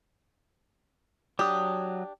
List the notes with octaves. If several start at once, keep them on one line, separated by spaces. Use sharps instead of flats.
F#3 D4 G4 D#6